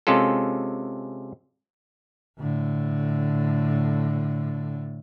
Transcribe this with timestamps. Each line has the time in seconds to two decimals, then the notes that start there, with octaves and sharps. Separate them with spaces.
0.07 C3 G#3 C#4 F4 A4
2.39 A2 D3